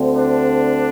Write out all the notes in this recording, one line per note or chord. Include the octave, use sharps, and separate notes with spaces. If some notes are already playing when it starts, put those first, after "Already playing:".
Already playing: D2 D3 C4
D4